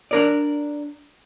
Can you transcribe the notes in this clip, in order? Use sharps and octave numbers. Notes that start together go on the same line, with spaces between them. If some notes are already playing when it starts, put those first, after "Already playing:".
D4 A#4 D5